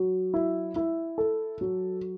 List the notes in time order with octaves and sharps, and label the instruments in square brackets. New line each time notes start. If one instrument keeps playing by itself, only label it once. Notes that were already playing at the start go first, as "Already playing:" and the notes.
Already playing: [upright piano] F#3
E4
E4
A4
F#3